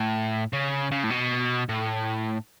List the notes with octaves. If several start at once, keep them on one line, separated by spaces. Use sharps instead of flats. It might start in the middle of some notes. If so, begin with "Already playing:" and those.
Already playing: A2
C#3
C#3
A2
B2
A2